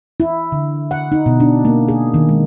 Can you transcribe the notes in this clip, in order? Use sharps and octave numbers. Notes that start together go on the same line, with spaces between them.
E4
D3
F#5
D#4
B2
D4
A#3
G#4
D#3
G#3